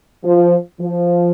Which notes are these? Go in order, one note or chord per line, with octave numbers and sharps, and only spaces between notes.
F3
F3